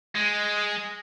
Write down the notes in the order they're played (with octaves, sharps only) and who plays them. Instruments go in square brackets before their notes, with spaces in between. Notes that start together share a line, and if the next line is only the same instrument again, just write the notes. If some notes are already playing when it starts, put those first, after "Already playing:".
[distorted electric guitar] G#3